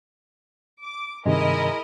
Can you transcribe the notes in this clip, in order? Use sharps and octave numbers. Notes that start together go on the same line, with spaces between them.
D6
G2 C3 D#3 G#3 E4 A#4 D#5